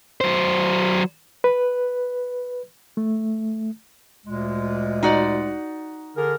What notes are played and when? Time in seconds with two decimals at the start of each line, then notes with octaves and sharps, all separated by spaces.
0.21 F#3 C5
1.44 B4
2.97 A3
4.26 D2 A#2 G#3
5.03 D#4 F#4 D5
6.16 D3 G#4 A#4